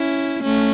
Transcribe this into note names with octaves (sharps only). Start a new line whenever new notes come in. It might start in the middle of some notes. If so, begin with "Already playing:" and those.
Already playing: C#4 E4
A3 C#4